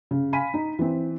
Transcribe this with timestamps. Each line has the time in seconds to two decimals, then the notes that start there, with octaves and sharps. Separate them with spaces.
0.11 C#3
0.33 F5 G#5 B5 B6 D#7
0.54 D#4
0.79 E3 C4